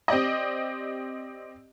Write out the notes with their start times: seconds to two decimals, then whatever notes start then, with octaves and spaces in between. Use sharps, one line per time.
0.08 C4 G4 D5 D#5